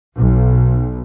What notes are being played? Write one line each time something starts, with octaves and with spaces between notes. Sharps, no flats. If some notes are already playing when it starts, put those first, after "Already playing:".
B1